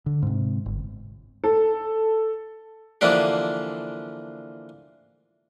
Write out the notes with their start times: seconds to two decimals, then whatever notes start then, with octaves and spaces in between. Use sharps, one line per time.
0.06 D3
0.23 G#2 C3
0.66 G1
1.44 A4
3.01 D3 E3 F3 A#3 D4 G4